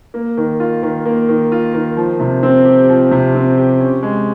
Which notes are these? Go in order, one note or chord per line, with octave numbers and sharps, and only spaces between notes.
A#3
D#3
F4
D#3
A#3
D#3
F4
D#3
F3
C3
C4
G4
F3
C3
C4
G4
C#4
G#3